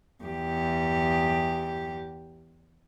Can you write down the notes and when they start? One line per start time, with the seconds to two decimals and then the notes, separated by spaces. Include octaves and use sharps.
0.23 E2 G4